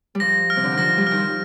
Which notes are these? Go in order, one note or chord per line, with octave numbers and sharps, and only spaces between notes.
G3
F3 A#6
F6
C3
D3
D#3
F3 A#6
G3
D#3 F6
F3